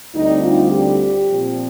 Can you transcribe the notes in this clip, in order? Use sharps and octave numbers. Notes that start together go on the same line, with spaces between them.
D2 D3 G3 C4 D#4
F4
G4
A#2 F3 C4